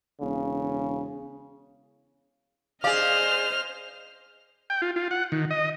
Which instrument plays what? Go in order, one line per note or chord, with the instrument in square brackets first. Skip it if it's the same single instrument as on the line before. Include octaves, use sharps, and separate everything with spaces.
[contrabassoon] E1 [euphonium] C#3
[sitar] G#4 D5 [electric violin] C5 D#5 [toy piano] F5 [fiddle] F6
[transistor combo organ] G5
F4
F4
F#5
D#3
D#5